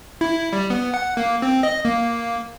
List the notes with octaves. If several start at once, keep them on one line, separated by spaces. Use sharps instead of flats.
E4
G3
B3
F#5
A#3
C4
D#5
A#3